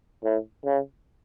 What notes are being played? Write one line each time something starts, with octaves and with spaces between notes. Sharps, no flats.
A2
C#3